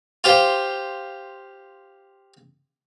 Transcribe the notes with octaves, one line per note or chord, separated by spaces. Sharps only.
F4 G4 C5